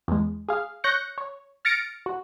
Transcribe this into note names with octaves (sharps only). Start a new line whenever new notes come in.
E2 G#3
G#4 F5
C#5 F#6 G6 A#6 C#7
C#5
F6 A6 A#6 C#7 D7
F#4